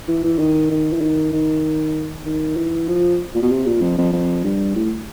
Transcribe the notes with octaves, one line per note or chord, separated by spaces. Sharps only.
E3
E3
D#3
D#3
E3
D#3
D#3
D#3
E3
F3
A#2
B2
C3
A#2
F2
F2
F2
G2
A2